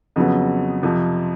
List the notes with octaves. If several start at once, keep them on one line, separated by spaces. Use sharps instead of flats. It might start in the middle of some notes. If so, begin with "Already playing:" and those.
F2 C#3 F#3 B3
F2 C3 F3